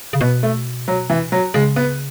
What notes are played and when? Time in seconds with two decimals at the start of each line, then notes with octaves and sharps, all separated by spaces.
0.13 C#3
0.21 B2 B3
0.43 A3
0.88 F#3
1.10 E3
1.32 F#3
1.54 C#3 G#3
1.76 B3